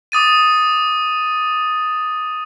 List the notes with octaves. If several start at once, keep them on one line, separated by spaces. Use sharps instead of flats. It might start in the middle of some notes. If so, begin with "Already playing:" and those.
D6 D#6 A6 D#7